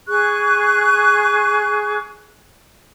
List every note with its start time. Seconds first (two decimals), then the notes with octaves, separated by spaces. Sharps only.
0.08 G#4 C#6 F#6